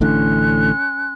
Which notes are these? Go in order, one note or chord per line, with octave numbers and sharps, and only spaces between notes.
A1 A2 D3 C#4 C6 F#6